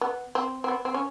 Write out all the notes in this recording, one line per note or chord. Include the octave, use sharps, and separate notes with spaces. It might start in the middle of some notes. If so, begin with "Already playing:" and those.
B3
C4
C4
B3
C4
C#4